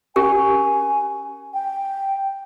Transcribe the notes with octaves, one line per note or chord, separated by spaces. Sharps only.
C#4 G4 A#4 G#5
G5